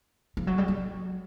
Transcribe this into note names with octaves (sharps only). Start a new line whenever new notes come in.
F3
F#3
G3
F#3